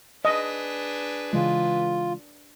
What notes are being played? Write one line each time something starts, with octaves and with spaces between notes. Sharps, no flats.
D4 G#4 B4 D#5
C#3 E3 G#3 F4